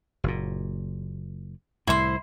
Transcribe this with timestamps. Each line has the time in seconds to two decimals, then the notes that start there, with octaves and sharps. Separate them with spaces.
0.24 F#1 A#2
1.87 C2 A2 E4 C5